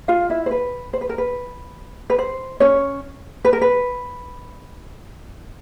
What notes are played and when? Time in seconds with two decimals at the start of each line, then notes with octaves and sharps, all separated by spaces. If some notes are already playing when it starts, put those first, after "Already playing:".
0.08 F4 F5
0.30 E4 E5
0.46 C5
0.51 B4
0.93 C5
1.01 B4
1.09 A#4
1.18 B4
2.10 B4
2.18 C5
2.60 C#4 C#5
3.45 B4
3.53 A#4
3.61 B4